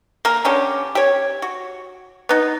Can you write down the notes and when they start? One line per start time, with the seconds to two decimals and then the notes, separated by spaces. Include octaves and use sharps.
0.25 A#3 A#4
0.45 D3 C#4 G4
0.95 G4 C#5
1.42 F#4
2.29 B3 D#4